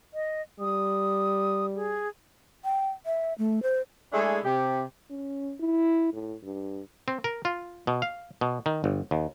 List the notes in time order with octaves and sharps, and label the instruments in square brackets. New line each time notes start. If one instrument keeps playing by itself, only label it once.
[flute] D#5
[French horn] G3 [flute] D#6
[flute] G#4
[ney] G5
E5
A3
C5
[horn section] G#3 A3 D4 E4 G#4
C3 G4
[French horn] C#4
E4
A2
G2
[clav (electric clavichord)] C4
A#4
F4
B2
F5
B2
D#3
G1
D#2